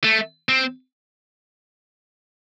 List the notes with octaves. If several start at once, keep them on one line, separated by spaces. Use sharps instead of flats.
A3
C4